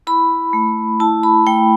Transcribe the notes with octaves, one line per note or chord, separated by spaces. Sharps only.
E4 B5
A3
E4 A5
B5
A3 G5